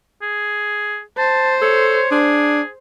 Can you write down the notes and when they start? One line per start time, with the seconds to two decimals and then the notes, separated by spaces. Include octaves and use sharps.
0.22 G#4
1.18 C5 A5
1.62 A4 C#5
2.11 D4 G#4